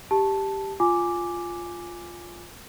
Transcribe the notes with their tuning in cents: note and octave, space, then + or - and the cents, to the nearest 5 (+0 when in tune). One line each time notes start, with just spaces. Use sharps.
G4 +0 A5 -5
F4 +0 G#5 +0 D6 +0